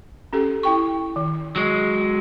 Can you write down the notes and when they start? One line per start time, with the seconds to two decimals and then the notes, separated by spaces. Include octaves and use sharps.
0.33 C#4 G4 A4
0.63 E4 G5 C#6
1.16 D#3
1.56 F#3 G#3